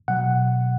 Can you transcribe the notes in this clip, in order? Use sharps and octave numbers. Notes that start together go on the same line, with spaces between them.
B2 F#3 F#5